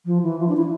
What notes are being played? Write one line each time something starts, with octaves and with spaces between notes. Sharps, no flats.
F3
E3
F3
D4
E4